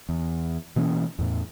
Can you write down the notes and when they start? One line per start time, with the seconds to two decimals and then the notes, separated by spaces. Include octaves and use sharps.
0.09 E2
0.76 B2 E3 A#3 C#4
1.19 E2 A2